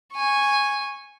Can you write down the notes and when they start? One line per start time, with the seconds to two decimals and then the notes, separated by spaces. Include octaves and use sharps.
0.13 G#5 C#6